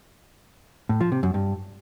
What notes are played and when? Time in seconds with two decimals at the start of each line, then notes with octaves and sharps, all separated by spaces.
0.89 A2
1.01 F3
1.12 C3
1.23 F#2
1.34 G2